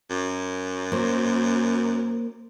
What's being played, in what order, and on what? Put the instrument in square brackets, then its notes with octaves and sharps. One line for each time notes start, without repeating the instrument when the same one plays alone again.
[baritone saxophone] F#2
[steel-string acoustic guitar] A#3 C5